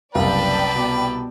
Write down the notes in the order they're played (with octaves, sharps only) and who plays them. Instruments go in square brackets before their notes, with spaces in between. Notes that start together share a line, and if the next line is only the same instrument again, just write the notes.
[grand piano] F#1 F5 [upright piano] C2 [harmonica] B4 [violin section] D5 G5 A5
[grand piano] B2 D6